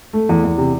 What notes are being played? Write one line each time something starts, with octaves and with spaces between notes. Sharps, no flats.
A3
E2
E2
C3